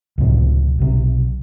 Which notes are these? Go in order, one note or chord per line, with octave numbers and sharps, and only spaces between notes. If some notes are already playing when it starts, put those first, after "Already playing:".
C#2 A2 C3 F3
B1 C3